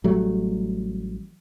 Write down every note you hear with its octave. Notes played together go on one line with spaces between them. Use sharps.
A1 F#3 G3 A3